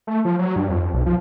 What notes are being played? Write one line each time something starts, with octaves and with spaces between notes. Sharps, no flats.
A3
F3
F#3
G2
F2
B1
F3